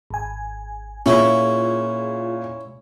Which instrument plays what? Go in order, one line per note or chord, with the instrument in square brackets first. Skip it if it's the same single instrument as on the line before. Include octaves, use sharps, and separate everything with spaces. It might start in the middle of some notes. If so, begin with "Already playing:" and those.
[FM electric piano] G#1 G#5
[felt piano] A#2 [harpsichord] C#4 E4 [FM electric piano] F4 G#4